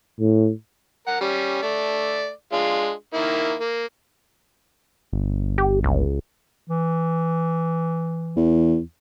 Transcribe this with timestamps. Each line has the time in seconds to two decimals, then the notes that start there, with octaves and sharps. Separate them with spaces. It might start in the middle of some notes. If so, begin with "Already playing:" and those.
0.21 A2
1.07 A#4 F#5
1.21 G3 C#4
1.63 A3 D5
2.52 G#3 D4 F4
3.14 D#3 A#3 E4
3.61 A#3
5.12 G1
5.58 G4
5.84 C#2
6.68 E3
8.37 E2